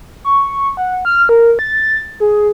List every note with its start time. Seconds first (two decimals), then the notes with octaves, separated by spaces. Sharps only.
0.24 C#6
0.77 F#5
1.05 F6
1.29 A#4
1.59 A6
2.20 G#4